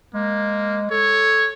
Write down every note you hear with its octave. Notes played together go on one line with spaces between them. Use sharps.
G#3 A#3
A4 C#5